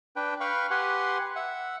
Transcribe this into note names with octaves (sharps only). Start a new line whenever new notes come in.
D4 B4 G5
B4 F5 G5 B5 C#6
G4 B4 F#5 G#5 C6
E5 F#5